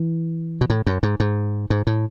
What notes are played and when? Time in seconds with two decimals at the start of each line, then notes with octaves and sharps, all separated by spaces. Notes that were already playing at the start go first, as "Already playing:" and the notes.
Already playing: E3
0.61 B2
0.70 A2
0.87 F#2
1.03 G#2
1.20 G#2
1.70 G#2
1.87 A2